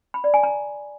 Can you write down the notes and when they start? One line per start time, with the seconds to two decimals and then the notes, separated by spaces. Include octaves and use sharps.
0.14 B5
0.24 D5
0.34 G#5
0.43 A#5